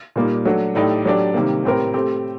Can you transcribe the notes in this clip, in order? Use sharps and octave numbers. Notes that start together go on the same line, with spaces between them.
A#2 G3 A#3 D#4
F#3 A3 D4 F#4
A2 A3 D#4 G4 D5
F#3 A3 D4 G4 D5
C3 D#3 G3 A#3
A2 A3 C4 G4 A#4
A3 C4 G4